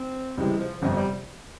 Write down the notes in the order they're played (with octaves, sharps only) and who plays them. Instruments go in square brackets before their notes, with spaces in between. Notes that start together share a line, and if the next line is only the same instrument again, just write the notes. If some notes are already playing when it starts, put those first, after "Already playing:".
Already playing: [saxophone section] C4
[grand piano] C#2 C3 E3 G3 [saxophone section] G#3
[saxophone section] F3
[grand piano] G1 F2 C3 [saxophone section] F3
[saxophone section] G3